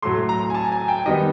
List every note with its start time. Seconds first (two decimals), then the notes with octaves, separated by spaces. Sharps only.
0.02 A2 F#3 A3 C6
0.29 A#5
0.50 G#5
0.54 A5
0.72 G#5
0.88 G5
1.06 D#3 G3 B3 D#5